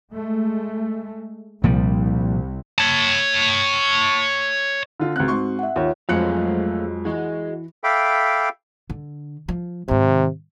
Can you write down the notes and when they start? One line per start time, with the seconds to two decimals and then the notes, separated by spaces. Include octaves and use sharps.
0.13 G#3 A3
1.64 C2 A#2 F3 G3
2.78 C#5 A5
5.00 D3 F4
5.16 C#2 C4 F#4 F#6
5.28 G#2 C6 C#6
5.59 E5 F#5
5.76 D#2 F4 C#5
6.09 F2 F#3 G#3 A3 C5 F5 F#6 C#7
7.05 E3 F#4 G#4 D#5
7.84 A4 E5 F5 G5 B5 D6
8.90 D3
9.48 F3
9.88 G#2 C3 D#3